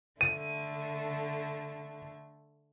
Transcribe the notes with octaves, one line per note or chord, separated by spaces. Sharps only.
D3 A3 D#7